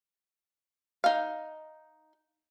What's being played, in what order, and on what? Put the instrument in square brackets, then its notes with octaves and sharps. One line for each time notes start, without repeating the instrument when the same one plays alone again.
[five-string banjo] D#4 F5